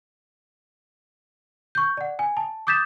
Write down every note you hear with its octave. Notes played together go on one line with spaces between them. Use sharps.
C#6 G6
D5 F#5
G#5
A5
D6 D#6 G6 A6 B6 E7